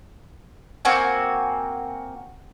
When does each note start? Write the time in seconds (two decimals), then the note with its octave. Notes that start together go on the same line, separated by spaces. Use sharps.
0.85 A#3 C4 F#4 G#5